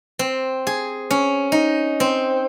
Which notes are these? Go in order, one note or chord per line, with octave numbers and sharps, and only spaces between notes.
C4
G#4
C#4
D#4
C4